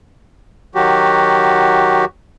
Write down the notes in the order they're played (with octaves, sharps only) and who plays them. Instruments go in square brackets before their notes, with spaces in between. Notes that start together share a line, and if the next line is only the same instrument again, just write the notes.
[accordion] D#3 F#3 F#4 G4